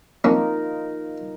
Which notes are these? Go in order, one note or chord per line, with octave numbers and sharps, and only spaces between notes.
F2 A#3 C#4 D#4 F4 A#4